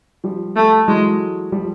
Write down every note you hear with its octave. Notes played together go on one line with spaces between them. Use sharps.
F3 G3
A3
E3 F#3 G#3
F3 G3